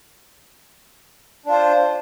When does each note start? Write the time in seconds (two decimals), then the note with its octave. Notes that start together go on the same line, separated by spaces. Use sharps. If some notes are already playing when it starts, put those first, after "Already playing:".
1.46 D4
1.49 F4
1.52 C5